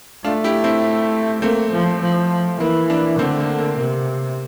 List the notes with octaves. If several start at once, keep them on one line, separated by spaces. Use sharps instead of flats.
A3 D4 F4
E4 G4
C4 E4
A3 A#3 C4
F3
F3
E3 A#3
A#3 D4
D3 A3 C4
A#3
A#3
C3 A#3